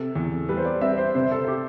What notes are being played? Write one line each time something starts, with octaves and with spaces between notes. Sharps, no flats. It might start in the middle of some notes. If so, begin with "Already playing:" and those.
Already playing: C3 A4
E2
G3 B4
C5
D5
C4 E5
C5
C3 C5
A4
A4
G4